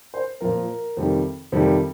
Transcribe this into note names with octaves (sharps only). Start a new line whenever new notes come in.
C5
A#2 F3 A#4
F2 C3 D#3 G3
F2 C3 D#3 G3